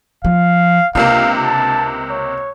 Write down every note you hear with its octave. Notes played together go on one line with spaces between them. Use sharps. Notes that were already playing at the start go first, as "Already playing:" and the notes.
F3 F5
C#2 C3 A#3 D4 F5
A5
C#5